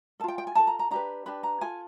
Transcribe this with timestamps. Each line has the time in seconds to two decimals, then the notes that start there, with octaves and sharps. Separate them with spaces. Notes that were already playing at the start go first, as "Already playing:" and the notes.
0.20 A4 A5
0.24 F4 G5
0.38 G5
0.47 G#5
0.55 F4 A4 A5
0.67 A#5
0.79 A#5
0.91 D4 G4 B4 A#5
1.26 D4 G4 B4 B5
1.43 A#5
1.61 F4 A4 G#5